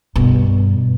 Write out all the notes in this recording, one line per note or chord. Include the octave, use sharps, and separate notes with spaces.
G2 B2